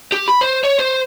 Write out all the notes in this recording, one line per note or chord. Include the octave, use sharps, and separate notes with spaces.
G4
B5
C5
C#5
C5